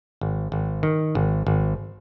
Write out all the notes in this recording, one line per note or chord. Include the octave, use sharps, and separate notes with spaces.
G#1
G#1
D#3
G#1
G#1